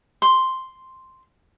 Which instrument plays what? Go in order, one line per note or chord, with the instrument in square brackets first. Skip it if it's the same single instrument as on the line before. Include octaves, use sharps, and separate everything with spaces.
[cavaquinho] C6